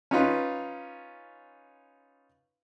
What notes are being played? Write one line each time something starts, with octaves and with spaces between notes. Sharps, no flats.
C#4 D#4 F4 B4